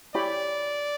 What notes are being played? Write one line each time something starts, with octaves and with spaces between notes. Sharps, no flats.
E4 G4 C#5 D5 G5 B5